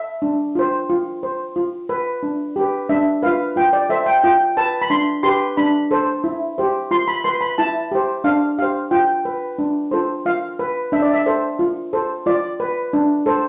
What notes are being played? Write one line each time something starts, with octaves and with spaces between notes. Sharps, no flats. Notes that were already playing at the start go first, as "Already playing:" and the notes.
Already playing: E5
D4
F4 C5
F4
C5
F4
B4
D4
G4 B4
D4 E5
F4 B4 F5
F4 G5
D5
A4 C5 E5
G5
F4 G5
B4 A5
B5
D4 C6
G4 B4 C6
D4 B5
A4 C5
E4
G4 C5
F4 C6
B5
B4 C6
B5
E4 A5
G4 C5
D4 F5
G4 C5 F5
F4 G5
B4
D4
F4 A4 C5
F4 F5
B4
D4 E5
D5
E5
A4 C5
F4
A4 C5
F4 D5
B4
D4
A4 C5